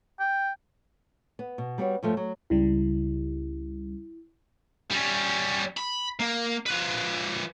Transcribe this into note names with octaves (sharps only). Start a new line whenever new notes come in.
G5
B3
B2
G3 B3 F#4 C#5
G2 F3 A3
F#3
C#2 C#3 G3 E4
G3 C#4
B5
A#3
F3 B4